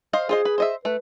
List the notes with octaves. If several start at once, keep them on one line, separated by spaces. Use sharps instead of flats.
C5 D#5 F5
F4 G#4 C5 D#5
B4
C5 D#5 E5
A3 B4